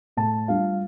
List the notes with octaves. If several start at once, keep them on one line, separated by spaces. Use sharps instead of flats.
A2 A5
G3 D4 F4 F5